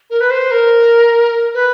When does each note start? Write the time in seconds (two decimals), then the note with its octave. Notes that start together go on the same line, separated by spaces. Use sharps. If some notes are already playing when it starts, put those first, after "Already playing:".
0.10 A#4
0.20 B4
0.30 C5
0.51 A#4
1.54 B4